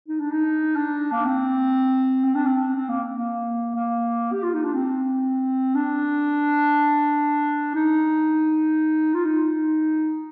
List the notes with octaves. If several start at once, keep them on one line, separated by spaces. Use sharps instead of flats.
D#4
D4
D#4
D4
A#3
C4
C4
D4
C4
C4
A#3
A#3
A#3
G4
F4
D#4
D4
C4
D4
D#4
F4
D#4